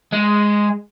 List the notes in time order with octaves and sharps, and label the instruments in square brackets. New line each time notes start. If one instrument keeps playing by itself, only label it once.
[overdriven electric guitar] G#3